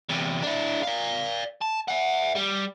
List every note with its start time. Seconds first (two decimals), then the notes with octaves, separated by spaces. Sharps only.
0.10 E2 C3
0.43 D4 E4
0.83 D5 F5
1.61 A5
1.88 E5 F#5
2.35 G3